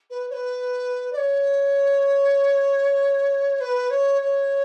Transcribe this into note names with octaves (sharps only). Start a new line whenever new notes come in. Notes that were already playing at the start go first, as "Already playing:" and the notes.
B4
C#5
B4
D5
C#5
B4
C#5
C#5